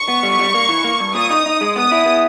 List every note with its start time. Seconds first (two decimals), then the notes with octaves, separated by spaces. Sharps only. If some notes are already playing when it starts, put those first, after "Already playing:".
Already playing: C#6
0.08 B3
0.23 G3
0.39 G3
0.55 A#3
0.69 E3
0.84 A#3
1.00 G2
1.15 A#2 D#6
1.30 D#4
1.46 D#4
1.61 G#3
1.76 B3 D#6
1.91 E4
2.06 B3